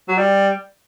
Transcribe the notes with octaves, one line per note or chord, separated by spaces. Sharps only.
F#3
G3